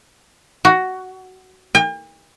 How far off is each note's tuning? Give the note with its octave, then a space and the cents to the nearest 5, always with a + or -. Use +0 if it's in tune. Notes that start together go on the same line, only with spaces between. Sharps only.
F#4 +10
G5 +45